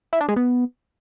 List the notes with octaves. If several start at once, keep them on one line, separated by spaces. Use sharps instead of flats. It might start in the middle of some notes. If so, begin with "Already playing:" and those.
E4
D4
G#3
B3